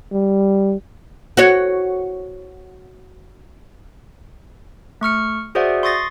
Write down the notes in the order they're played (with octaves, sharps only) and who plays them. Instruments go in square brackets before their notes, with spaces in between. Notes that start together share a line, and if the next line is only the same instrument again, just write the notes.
[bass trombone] G3
[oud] F#4 C#5
[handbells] A3 C#6 F6 C#7
F#4 G#4 C5 D5 E5 F#5
C6 C#6 D#6 A6 A#6 C7